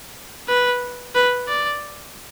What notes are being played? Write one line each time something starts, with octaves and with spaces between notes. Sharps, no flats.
B4
B4
D5